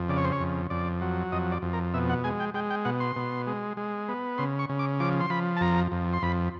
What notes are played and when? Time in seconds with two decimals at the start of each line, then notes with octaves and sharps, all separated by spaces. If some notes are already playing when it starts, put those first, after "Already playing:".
Already playing: F2
0.09 C#3 D5
0.17 C#5
0.25 C5
0.32 C#5
0.40 F2
0.70 F2 D5
1.01 F#3
1.32 F2 D#5
1.52 D5
1.62 F2
1.73 A#4
1.94 B2 E5
2.09 F#5
2.24 G#3 G#5
2.40 G5
2.54 G#3 G5
2.70 G5
2.85 B2 F#5
3.00 C6
3.16 B2
3.47 G#3
3.77 G#3
4.09 B3
4.38 C#3 C6
4.59 C#6
4.69 C#3
4.79 D6
5.00 F3 D6
5.21 C6
5.30 F3 B5
5.57 A5
5.61 F2 A#5
5.92 F2
6.13 C6
6.22 F2 B5